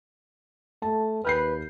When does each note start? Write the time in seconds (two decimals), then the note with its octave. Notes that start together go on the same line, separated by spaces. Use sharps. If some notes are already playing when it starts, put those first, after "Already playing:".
0.82 A3 A5
1.25 D#2 B4 F6 G6 C7